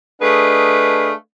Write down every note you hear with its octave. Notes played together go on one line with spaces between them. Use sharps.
A3 D4 G#4 B4 D#5 F5